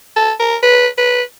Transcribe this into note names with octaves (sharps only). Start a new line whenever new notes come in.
A4
A#4
B4
B4